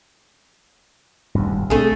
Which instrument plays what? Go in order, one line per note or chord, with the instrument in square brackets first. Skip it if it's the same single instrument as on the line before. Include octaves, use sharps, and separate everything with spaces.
[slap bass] D#1 D2 G2
[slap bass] B1 C4 D4 [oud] A3 G#4